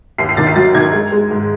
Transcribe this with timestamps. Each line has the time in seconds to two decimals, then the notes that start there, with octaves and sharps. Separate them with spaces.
0.18 D#2 C7
0.29 C7
0.37 D#3 A6
0.47 C7
0.56 F#3 A6
0.75 D#3 G#6
0.93 G#3
1.12 G#3
1.31 G#2